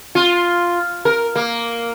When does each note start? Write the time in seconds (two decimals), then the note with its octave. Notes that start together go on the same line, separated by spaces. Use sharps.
0.15 F4
1.05 A#4
1.36 A#3